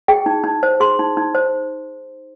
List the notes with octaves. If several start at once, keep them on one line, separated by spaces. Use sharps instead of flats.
G#4 G5
D#4
D#4
C5
G#4 C6
D#4
D#4
C5